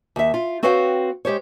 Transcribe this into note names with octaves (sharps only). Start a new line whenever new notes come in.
D#2 E5
F4
C4 F#4 B4 C#5 F5 G5
G#3 G4 C5 C#5